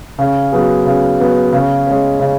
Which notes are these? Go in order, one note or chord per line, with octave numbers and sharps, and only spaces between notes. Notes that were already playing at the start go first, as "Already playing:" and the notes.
C#3
F#3 B3 G#4
C#3
F#3 B3 G#4
C#3
G#3 C#4
C#3